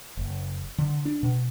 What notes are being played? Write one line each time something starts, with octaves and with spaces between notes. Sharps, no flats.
F#1
D3
D4
B2